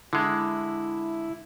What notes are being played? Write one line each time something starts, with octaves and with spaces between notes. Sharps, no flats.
D3 G#3 E4